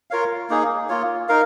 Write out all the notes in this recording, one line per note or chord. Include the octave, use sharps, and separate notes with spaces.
F4 A#4 C#5 F5
A#3 D#4 G#4
A#3 F4 C#5
D#4 A#4 F5